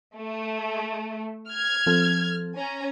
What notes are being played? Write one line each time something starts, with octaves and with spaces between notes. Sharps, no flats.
A3
F6 G#6
F3 C4 A4
C#4 G#5 A#5